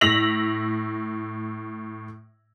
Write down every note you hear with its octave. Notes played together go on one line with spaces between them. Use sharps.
A2 E6 A#6 B6 F7 F#7